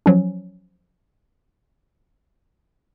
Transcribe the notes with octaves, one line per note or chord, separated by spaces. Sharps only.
F3 F#3 C#4